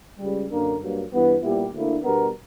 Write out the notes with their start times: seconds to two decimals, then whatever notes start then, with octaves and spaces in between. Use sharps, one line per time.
0.19 C#2 C#3 G3
0.50 F#2 D3 A#3 D4 A#4
0.80 G2 F#3 A#3
1.11 G2 E3 B3
1.42 A#2 G3 B3 E4 G4
1.72 D2 D3 A#3 E4
2.04 B2 G3 B3 D4 A#4